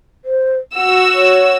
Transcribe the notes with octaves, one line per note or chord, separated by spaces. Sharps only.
C5
F#4 F#5 E6
C#5